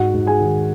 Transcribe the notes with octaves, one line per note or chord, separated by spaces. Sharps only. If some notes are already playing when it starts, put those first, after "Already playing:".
Already playing: G#2 F#4 F#5
G#2
G#4 G#5
D#3